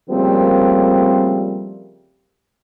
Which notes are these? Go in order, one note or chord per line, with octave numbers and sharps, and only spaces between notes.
C#3 F3 G3 A3 A#3 C4